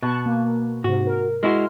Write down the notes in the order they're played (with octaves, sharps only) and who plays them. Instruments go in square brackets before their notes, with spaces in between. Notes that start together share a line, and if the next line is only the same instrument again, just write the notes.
[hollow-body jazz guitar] B2 [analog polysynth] A5 C#6 F#6
[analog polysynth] A#3
[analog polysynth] G#2 C3 [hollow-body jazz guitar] F#4
[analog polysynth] A#4
[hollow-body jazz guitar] G#3 E4 F#4 [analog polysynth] C6 F6